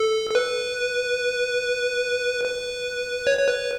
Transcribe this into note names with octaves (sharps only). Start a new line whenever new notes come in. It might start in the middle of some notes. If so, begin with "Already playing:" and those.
Already playing: A4
A4
B4
B4
C#5
C#5
B4